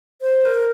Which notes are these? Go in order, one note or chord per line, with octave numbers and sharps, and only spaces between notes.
C5
A#4